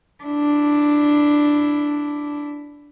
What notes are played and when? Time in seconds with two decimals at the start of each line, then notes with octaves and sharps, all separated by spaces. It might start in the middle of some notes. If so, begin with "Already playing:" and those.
0.24 D4 E4